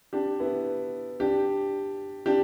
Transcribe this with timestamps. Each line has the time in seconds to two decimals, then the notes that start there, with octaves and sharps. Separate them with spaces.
0.13 D4 G4
0.40 B3 E4
1.20 D4 G4
2.26 D4 G4